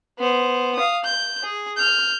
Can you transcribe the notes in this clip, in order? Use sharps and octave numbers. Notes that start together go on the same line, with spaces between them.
B3 C5
F5 D#6
G6
G#4
F6 G6